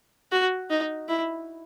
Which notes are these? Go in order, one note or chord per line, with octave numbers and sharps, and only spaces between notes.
F#4
D#4
E4